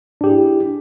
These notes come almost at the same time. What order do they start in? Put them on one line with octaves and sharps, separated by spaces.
D4 G4 G#4 E4